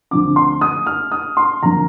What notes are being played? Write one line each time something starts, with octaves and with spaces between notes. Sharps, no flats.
D2 D3 F3 C4 D6
C6
D#6
F6
D#6
C6
G1 F2 D3 F3 A#3 A#5